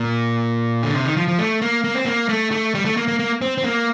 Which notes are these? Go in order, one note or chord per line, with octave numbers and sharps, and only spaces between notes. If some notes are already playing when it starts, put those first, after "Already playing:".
Already playing: A#2
D3
C3
D#3
F3
F3
A3
A#3
A#3
C4
A#3
A3
A3
G3
A3
A#3
A#3
A#3
C4
C4
A#3